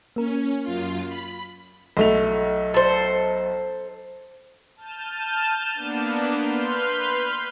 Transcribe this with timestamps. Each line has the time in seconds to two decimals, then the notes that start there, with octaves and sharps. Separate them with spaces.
0.16 A#3 C#4 A#4
0.63 F#2 F4
1.09 B5
1.97 B1 A3 F7
2.74 A4 C5
4.76 A5 F6 G6 D#7 E7
5.74 A#3 B3 D4
6.35 B4 C6 F6 G6